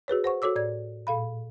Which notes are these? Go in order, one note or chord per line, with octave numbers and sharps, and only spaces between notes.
F#4 G#4 B4 C#5
C5 F#5 C#6
F#4 A4 C#5 D6 E6
A2 D5 G#6
A#2 A4 F5 B5